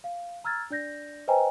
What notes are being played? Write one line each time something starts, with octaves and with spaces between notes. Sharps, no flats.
F5
A#5 E6 F6 G#6 A6
D4 D5 G6 A#6
B4 C5 D#5 G5 G#5 A#5